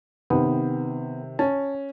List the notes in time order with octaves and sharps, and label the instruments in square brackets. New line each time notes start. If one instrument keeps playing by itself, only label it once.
[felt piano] C3 D#3 [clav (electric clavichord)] B3
[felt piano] C#4 [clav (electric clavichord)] A5